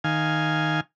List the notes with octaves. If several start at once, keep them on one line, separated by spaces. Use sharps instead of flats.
D#3 F5 G#5